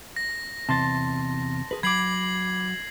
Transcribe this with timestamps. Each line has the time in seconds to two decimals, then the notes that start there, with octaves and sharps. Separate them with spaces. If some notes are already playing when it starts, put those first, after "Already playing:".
0.16 A#6
0.69 E2 C3 A5 C6 A6
1.71 G#4 B4
1.83 F#3 B5 D6 G#6 C7 F#7